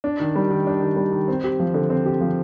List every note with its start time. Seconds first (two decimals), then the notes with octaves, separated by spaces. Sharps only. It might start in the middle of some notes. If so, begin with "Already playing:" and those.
0.04 D4
0.20 D#3
0.36 G3
0.51 D#3
0.67 D4
0.82 D#3
0.97 G3
1.12 D#3
1.28 C4
1.44 G4
1.60 F3
1.74 D3
1.90 C4
2.06 G4
2.21 F3